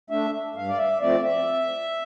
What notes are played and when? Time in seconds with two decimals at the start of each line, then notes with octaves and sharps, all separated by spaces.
0.10 A3 D4 E5
0.55 G2 F5
0.68 D5
0.78 E5
1.01 F3 A3 C4 D5
1.23 E5